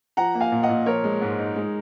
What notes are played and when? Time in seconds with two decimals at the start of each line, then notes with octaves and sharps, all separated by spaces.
0.17 F3 F#5 A#5
0.35 A#3
0.40 F5 G#5
0.52 A#2
0.63 D#5 F#5
0.69 A#2
0.86 F3 A#4 C#5
1.04 G#3
1.21 G#2
1.39 D#4
1.56 G#3